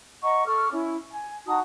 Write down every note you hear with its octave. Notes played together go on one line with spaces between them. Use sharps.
D#5 F#5 A#5 C#6
A4 C#6 D6 F6
C#4 E4
G#5
D#4 F#4 A5 D#6